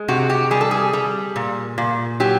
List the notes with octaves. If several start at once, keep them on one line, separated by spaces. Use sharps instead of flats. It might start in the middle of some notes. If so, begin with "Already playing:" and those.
Already playing: G#3
C3 F#4
G4
G3 G#4
A4
G#4
G3
A#2
A#2
F#3 G4